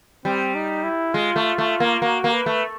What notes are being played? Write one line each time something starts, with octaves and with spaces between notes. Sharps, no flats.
G3 C4
D#4
E4
G#3 F4
A3
A3
A#3
A#3 F#4
A#3
B4
A3